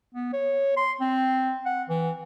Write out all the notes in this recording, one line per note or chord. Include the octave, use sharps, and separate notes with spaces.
B3
C#5
C6
C4
F#5
E3